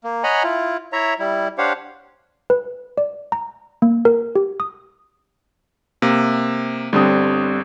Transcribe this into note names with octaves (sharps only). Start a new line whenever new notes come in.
A#3
C#5 D#5 F#5 G#5 A#5 B5
E4 F4
E4 C#5 E5 A#5
G3 E4
D4 G4 C5 C#5 F5 F#5
B4
D5
A#5
A#3
A#4
G4
D#6
C3 A#3
G1 D3 G3 C4 D#6